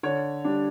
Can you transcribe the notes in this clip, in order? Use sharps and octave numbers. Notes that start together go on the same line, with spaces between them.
D3 C#5
G3 D4